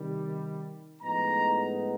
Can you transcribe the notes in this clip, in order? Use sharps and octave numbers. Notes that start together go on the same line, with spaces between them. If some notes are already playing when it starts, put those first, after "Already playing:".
Already playing: C3 D#3 G3
A2 F3 G#3 B3 D#4 A#5